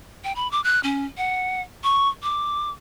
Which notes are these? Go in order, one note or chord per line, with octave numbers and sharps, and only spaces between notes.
G5
B5
D6
F#6
C#4
F#5
C#6
D6